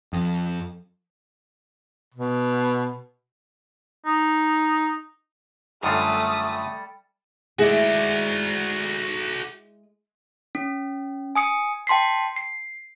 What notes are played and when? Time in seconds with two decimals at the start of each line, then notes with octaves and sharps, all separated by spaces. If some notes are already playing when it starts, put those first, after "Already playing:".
0.13 F2
2.14 B2
4.06 D#4
5.83 F#2 D3 G3 A3 F4 A4 D#6
7.59 G#3 E4 F#4 G#4 D5
10.55 C#4
11.35 G#5 D#6 C#7
11.87 G5 A5 C6 B6 C7
12.36 C7